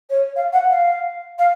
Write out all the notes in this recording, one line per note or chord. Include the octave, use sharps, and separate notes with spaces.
C#5
F5
F#5
F5
F5